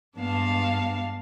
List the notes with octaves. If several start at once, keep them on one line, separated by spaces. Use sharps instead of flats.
G2 G#3 B3 D4 F5 A5